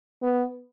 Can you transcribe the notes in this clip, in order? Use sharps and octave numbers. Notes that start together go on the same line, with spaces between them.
B3